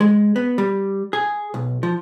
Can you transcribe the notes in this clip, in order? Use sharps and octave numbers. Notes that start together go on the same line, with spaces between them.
G#3
B3
G3
G#4
B1
F3